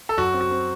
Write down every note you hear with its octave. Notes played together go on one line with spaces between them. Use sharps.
A4
F#2 F#4
C4
F#4
C4